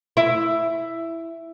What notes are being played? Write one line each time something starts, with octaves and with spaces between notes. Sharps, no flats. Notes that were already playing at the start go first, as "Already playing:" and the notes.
E4